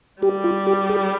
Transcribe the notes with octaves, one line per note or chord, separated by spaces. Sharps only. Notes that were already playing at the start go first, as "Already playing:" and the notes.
G3 G4
F4
G4
G#4